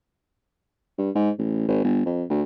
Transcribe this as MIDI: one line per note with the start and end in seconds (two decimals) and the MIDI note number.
0.99 1.10 43
1.15 1.30 44
1.39 1.65 33
1.68 1.84 32
1.84 2.05 31
2.06 2.24 41
2.30 2.43 38